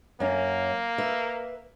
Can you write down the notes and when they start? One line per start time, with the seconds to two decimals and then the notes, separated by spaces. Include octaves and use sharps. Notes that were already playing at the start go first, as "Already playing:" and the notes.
0.20 F#2 A#3 C#4
0.98 B4 E5